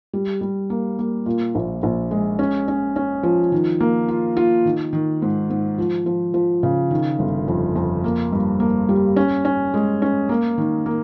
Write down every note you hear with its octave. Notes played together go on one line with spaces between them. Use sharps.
G3
G3
A#3
A#3
A#2
A#1
A#1
G#3
C#4
C#4
C#4
F3
D#3
A#3
F4
F4
D#3
D#3
G#2
G#2
F3
F3
F3
C#3
D#3
G1
F2
F2
A#3
G2
A#3
G3
C#4
C#4
G#3
C#4
A#3
D#3
A#3